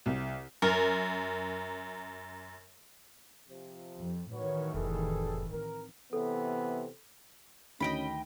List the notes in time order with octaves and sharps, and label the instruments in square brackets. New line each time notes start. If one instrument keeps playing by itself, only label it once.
[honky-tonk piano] C2
[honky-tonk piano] F#2 [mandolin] A#4
[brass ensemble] C3 F3
[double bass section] F2
[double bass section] A2 D#3 E3 [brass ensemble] F#4 B4 C#5
[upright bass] F1 F2 [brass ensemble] G3 G#4 A4
[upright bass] F3 C4 [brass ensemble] A#4
[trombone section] C3 E3 B3 [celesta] A4
[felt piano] D2 D#3 D7 [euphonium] C#4 [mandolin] D#5 G5 B5